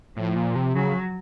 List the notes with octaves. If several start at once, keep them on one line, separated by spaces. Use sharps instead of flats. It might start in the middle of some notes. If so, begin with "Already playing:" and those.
A2 F3
A#2
C3
C#3 F#3